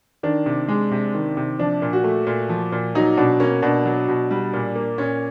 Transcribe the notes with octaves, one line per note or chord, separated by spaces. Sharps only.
D#3 D4
C3
G#3
C3
D#3
C3
F3 D4
A#2
F#4
A3
A#2
F3
A#2
F#3 D#4
B2 D4
A#3 C#4
B2 D4
F#3
B2
G3
A#2
A#3
A#2 C#4